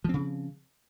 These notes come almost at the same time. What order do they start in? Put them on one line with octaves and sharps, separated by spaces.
F3 C4 C#3